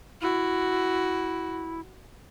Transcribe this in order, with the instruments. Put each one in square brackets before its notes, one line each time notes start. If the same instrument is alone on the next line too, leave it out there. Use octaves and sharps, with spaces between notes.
[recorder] E4 [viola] F#4